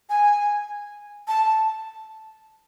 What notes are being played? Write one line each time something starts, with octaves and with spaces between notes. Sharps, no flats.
G#5
A5